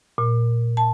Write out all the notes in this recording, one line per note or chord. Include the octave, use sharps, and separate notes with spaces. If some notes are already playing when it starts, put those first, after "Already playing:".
A#2
A5